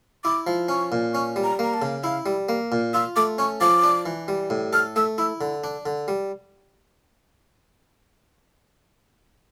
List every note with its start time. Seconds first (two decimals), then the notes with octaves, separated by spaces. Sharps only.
0.24 E4 D6
0.47 F3
0.69 C#4 C#6
0.92 A#2
1.14 C#4 C#6
1.36 G3
1.44 A#5
1.59 A#3 A#5
1.74 A5
1.82 C#3
2.04 E4 F5
2.26 G3
2.49 A#3
2.72 A#2
2.94 F4 E6
3.16 A3 D6
3.38 C#4 C#6
3.61 F3 D6
3.84 D4
4.06 E3
4.28 G3
4.50 A2
4.73 A4 F6
4.96 A3 E6
5.18 E4 E6
5.41 D3
5.64 D4
5.86 D3
6.08 G3